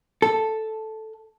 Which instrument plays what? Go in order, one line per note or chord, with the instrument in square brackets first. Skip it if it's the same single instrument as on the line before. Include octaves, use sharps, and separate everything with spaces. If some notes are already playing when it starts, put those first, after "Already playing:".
[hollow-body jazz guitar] A4